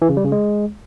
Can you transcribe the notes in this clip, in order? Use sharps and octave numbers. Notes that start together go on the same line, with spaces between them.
E3
C#3
G3
C#3
G#3